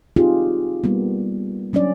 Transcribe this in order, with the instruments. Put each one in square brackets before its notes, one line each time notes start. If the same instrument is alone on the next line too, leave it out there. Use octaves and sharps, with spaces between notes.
[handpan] C4 D#4 F4 G4 G#4
G3 A#3 B3
F#3 C#4 D4 D5